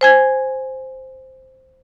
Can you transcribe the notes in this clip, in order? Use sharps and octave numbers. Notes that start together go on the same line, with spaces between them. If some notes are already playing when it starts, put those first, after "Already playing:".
C5 G#5 G#6